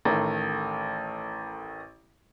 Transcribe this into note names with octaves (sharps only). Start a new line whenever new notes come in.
A1 D#3 A3 A#5